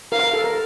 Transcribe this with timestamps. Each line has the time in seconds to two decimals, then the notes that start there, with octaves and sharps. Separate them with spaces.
0.12 A#4 F5
0.24 A#4
0.34 A4
0.44 A#4